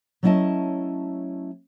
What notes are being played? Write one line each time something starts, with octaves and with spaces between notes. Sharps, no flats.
F#3 A3 C#4 E4 D#5 A5